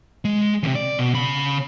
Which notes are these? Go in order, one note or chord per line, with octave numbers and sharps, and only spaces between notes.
G#3
E2 C3
D5
B2
C#3 B5